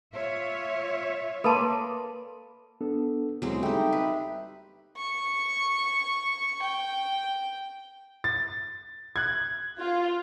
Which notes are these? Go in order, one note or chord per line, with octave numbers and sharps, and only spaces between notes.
F4 C#5 E5
A#3 A4 B4 D5 A5 B5 C6
B3 D4 A4
D#2 F#3 G#3 B3 C4 E4
G3 D#4 A4 E5 G5
B4 E5
C#6
G5
A6
F#6 G#6
F4